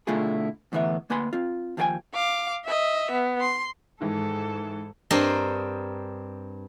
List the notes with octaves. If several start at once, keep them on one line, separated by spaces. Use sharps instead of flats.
B2 D3 A3 E4 F4 G#4
E2 A2 D3 E3 B3 E5
D2 A#3 B4 G#5 B5 C6
C4 F4
D#2 F3 D#4 A4 G5 G#5
F5 D6
D#5 E5
B3
C6
G#2 D#3 E3 G#3 A4
G2 C4 A#4 C5 D#5